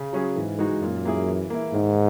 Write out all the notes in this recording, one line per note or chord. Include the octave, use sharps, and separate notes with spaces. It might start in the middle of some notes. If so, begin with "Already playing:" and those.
Already playing: C#3
F#3 C#4 G#4
G#2 E3
G#3 D#4 F#4
F#2 A#2
A#3 E4 G#4
E3
A#3 E4
G#2 D#3